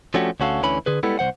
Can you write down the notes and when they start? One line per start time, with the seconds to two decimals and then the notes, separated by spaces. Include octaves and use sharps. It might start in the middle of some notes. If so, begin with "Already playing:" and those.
0.14 F3 A3 C#4 D4 F#4 G4
0.40 D2 C#4 F#4 A4 F5
0.63 D2 D3 E3 C#4 B5
0.86 D3 G#4 B4
1.03 G3 G#3 B3 E4 A4
1.19 C2 F3 C5 F#5